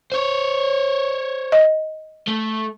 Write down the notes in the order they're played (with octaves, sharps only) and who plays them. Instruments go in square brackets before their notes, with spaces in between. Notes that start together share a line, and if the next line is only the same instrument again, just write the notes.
[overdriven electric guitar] C5 C#5
[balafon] D#5
[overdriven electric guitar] A3